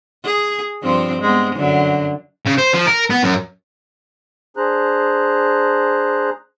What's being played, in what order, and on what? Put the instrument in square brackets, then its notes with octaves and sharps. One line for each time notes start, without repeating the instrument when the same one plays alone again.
[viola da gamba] G#4
G2 F3 C4
G#3 B3 C4
F#2 D3 F#3
[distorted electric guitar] C#3
C5
F3
A#4
B3
F#2
[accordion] D4 G#4 C5 A#5 F#6